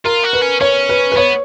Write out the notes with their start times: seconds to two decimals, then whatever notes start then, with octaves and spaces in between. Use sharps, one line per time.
0.05 F4 A#4
0.24 F#4
0.33 B4
0.42 C#4
0.61 C#4 C#5
0.89 B4
1.12 B4
1.16 B3 C#5